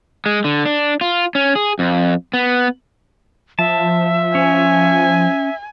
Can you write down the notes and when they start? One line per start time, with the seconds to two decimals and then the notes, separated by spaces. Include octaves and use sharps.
0.26 G#3
0.44 D3
0.66 D4
1.01 F4
1.35 C#4
1.55 G#4
1.79 F2
2.34 B3
3.59 F3 E5 A5
4.35 C#4 G#5